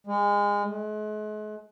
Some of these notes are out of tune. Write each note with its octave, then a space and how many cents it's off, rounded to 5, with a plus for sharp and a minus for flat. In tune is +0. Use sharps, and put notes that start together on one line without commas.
G#3 -25
G#3 +40